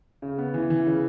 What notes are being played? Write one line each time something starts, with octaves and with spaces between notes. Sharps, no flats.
C#3
B3
E3
E3
C#3